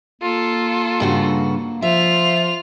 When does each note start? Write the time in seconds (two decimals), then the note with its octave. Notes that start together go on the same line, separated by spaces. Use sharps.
0.22 A#3 F4 A4
1.00 G2 C#3 F#4
1.82 F3 F4 E5 F7